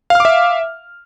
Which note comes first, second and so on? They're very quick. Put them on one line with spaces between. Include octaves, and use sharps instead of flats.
F5 F6 D6 E5